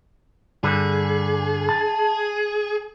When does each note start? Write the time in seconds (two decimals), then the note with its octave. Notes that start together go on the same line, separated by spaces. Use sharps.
0.64 G2 D3 G3 G#4
1.69 A5